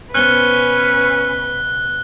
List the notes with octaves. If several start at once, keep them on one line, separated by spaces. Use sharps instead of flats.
B2 B3 C#4 B4 C5 F#6 G7